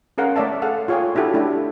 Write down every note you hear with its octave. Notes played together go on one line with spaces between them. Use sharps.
C#4 G#4 A#4 F5 F#5
A3 C#5 D5 E5 A5
G#4 A4 F5 F#5
F4 G#4 C#5 F5 G5 G#5
D4 E4 F#4 G4 A4
A3 D4 E4